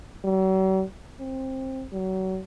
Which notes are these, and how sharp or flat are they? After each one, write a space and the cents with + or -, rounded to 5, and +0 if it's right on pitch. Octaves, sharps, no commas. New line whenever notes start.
F#3 +45
C4 +15
F#3 +30